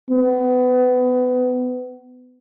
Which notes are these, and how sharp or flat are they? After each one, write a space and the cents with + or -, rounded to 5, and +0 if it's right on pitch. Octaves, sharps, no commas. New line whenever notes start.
B3 +25